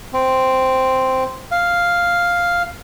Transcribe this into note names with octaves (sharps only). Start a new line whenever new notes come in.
C4
F5